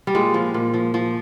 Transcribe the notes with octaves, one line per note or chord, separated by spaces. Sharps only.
G3
A#2 G#3
F3
A#2
F3
F3